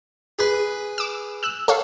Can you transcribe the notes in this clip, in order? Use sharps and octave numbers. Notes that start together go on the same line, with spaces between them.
G#4 B4
D6 E6
E6 F#6
A4 C#5 F5